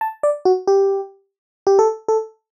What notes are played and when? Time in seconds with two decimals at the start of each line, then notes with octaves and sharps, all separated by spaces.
0.01 A5
0.23 D5
0.45 F#4
0.67 G4
1.67 G4
1.79 A4
2.08 A4